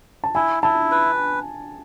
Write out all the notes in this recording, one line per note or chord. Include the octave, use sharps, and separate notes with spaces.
A5
E4 G#5
E4 A5
B4